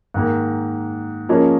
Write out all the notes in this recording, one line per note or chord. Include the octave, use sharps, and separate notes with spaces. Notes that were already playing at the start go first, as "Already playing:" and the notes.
G#2 D#3 A#3
F3 A#3 C#4 G#4 D#5